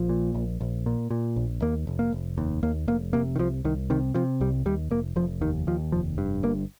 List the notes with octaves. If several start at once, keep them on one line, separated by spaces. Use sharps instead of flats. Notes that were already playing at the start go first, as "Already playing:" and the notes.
Already playing: A#1 F3
A#2
A#1
A#1
A#2
A#2
A#1
D#2 A#3
F1
A#3
F1
D#2
D#2 A#3
F1 A#3
C3 A#3
D#3
C2 F3
C2 D#3
C3 D#3
C3 F3
C2 G3
D#2 G3
F1 A#3
F1 F3
D#2 D#3
D#2 F3
F1 F3
G2
G1 A#3